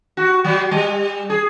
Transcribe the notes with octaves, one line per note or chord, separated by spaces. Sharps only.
F#4
F#3
G3
G#4